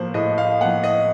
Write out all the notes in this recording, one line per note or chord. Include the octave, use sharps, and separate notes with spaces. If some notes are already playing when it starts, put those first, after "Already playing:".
Already playing: A2 F3 A#3 C5
A2 D#5
F5
F3 A#3 F#5
D#5